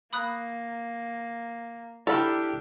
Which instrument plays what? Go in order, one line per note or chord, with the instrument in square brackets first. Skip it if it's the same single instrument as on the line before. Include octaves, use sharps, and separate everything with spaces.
[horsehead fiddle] A#3 [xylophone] B5 D#6 F#6
[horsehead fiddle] D4 G4 [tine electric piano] E4 F6 [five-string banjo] A4 [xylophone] A#5 B5